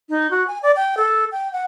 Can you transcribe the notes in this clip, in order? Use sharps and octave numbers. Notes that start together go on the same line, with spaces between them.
D#4
F#4
G#5
D5
G5
A4
G5
F#5